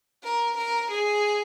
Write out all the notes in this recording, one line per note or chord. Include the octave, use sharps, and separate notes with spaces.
A#4
A#4
G#4